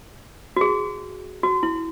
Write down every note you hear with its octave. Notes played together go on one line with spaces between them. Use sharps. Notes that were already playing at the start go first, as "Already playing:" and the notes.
F#4
G#4
F#4
E4